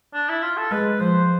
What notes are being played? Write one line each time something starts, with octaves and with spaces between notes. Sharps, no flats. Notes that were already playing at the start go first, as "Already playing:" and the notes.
D4
E4
F4
A4
G#3 B4
F3 C5